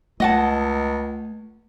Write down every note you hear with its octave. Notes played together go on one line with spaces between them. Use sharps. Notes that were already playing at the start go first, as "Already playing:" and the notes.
C#2 A3 D#5 F#5 A5